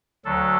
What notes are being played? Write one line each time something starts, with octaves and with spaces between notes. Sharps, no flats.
D2 D3 F#3 A4